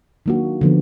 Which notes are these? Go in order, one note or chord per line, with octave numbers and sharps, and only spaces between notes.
D#3 F#3 A#3 D4 F#4
D3 F3 B3